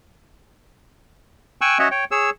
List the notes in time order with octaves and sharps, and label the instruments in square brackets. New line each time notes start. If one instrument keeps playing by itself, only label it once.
[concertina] G5 G#5 C#6 E6 F#6
C#4 F#4 C#5 D#5 E5 F#5
C#5 G5
G#4 C#5 E6